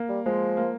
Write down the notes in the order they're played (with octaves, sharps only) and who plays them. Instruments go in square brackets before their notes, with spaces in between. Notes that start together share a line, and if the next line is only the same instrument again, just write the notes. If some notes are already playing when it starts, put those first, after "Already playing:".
Already playing: [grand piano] A#3
[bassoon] G3
[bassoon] F3 [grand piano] G#3
[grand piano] A#3